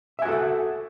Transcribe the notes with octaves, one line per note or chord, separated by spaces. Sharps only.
F#4 A4 E5 F#5 G#5